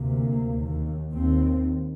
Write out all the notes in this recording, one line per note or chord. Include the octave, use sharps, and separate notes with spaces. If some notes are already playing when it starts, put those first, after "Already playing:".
Already playing: D2 C3 A#3
D#2
D#2 C4